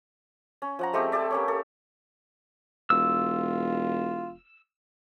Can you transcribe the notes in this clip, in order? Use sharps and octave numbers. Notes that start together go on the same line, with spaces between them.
C#4
F3 F#5 A#5
G#3 A3 C4 G4
G4 A4 D5 E5
A#3 C#4 C#5
A4
E1 F4 E6